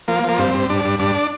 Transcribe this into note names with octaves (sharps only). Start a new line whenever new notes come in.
F3 A#3
F3
A#3
G2 C4
G2
G2 D4
G2
G2 D4